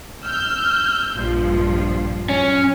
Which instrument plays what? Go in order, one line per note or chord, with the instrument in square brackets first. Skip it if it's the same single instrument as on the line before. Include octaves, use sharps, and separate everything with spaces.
[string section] E6 F6 G6
A#1 G2 F3
[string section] F#2 [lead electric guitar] C#4